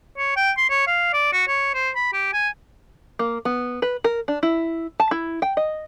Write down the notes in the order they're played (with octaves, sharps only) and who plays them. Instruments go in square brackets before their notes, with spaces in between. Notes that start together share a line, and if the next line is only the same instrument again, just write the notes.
[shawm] C#5
G5
C6
C#5
F5
D5
F#4
C#5
C5
B5
G4
G#5
[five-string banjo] A#3
B3
B4
A#4
D4
E4
A5
E4
G5
D#5